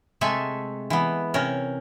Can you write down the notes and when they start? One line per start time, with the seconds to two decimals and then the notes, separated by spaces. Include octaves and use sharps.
0.21 C3 G#3 A3 A4 E5 G#5
0.90 E3 B3
1.34 C3 C#4 A#4